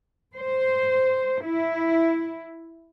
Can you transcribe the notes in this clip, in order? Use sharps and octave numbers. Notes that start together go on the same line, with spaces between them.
C5
E4